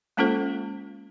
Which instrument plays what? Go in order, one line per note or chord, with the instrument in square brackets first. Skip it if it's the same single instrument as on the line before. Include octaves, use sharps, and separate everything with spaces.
[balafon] G#3 A#3 C#4 F4 A4 C5